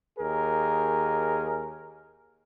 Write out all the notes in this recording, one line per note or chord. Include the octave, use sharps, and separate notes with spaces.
D#2 G#4 A#4